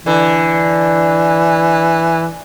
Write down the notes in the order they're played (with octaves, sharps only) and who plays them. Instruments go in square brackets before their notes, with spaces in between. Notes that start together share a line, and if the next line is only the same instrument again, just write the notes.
[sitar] D3 [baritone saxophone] E3